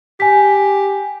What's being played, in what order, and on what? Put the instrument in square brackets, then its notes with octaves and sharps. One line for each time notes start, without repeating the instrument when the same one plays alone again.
[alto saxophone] G4 [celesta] G#5 B6